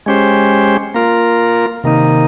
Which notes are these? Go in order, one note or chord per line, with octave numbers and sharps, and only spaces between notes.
G#3 C#4 G4 C5
A#3 F4 A#4
C3 D#3 A#3 D#4